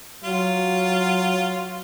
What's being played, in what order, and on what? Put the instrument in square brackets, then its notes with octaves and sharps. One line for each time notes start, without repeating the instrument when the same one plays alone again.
[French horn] F#3 [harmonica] F4